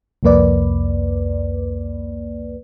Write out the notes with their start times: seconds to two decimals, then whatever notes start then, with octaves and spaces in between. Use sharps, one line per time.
0.23 C2 F2 A#3 B4 D5